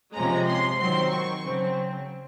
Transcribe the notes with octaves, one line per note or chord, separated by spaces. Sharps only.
C3 F3 G#3 C#4 A#5
C6
D#3 F#3 C4 C6
C#6
C#3 F#3 C4